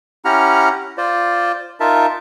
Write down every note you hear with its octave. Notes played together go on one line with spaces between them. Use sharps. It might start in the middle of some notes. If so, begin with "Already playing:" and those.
C#4 E4 G4 F#5 A#5 F6
F4 C5 D5
D#4 F4 A#4 E5 A5